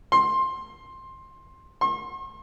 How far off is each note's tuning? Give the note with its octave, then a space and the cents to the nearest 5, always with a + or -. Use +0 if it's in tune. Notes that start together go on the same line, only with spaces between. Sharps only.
C6 +15
C6 +45